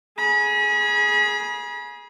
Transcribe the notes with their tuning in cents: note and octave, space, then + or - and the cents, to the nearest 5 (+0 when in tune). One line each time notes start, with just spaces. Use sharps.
G#4 +5 B5 -40